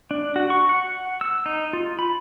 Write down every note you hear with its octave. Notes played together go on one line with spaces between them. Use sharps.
D4
F#4
C#6
F#5
E6
D#4
F4
B5